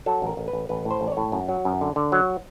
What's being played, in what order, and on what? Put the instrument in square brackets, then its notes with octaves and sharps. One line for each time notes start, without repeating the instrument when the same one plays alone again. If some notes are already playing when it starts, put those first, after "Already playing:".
[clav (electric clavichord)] F#3 A4
A1 A#4
A1
B4
A1
A1 B4
A2
C5
A1
D5
C#5
A2
F#2
F#3
F#2
D3
D3
F#3